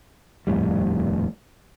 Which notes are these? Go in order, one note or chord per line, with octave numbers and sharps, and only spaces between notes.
D#1 F2 A2 G3